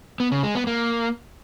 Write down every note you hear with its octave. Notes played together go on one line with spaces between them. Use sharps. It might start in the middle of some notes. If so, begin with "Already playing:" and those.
B3
C#3
G#3
B3
A#3